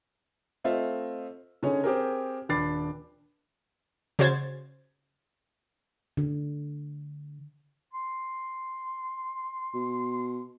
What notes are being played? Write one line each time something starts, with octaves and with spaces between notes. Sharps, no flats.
A3 C4 F4 D#5 E5
D3 C#4 D#4 G#4 C#5
C4 G4 G#4 A#4
D#1 D4 B5 D6 A6 C7
C#3 F#4 C5 G#6 A6
D3
C6
B2